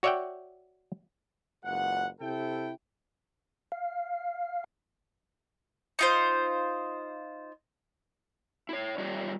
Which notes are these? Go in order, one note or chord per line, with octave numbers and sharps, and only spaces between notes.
F#4 C#5 D5 E5 F#5 G5
F#1 C#2 F#5
C3 E4 A4 G5
F5
D#4 F4 C5
E4 C#5
G3 F4 G4 C#5 D#5